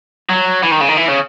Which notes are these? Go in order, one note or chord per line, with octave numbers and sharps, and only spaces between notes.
F#3
E3
D#3
C#3
D#3
E3
C#3